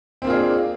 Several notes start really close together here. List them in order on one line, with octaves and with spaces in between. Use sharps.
C4 A#3 F4 G#4 D4